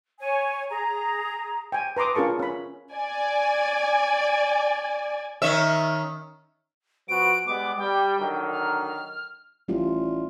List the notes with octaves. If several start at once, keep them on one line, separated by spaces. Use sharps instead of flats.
C#5 G#5
G#4 A#5
G5 G#5
B4 A#5 C6 D6 D#6
C#4 F4 G#4 A#4 A5 C#6
C#4 B5
D5 G#5
D#3 C#4 E5
F3 B3 F#4 D7
G3 G#3 B3 D6
G3 G5
D3 D#3 F#3
F6
A1 G3 A3 F4